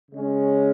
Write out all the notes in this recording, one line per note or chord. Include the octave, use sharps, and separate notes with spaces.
C#3 G#3 C#4